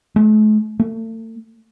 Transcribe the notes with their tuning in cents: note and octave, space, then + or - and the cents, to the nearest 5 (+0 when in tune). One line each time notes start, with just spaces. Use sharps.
A3 -45
A3 +35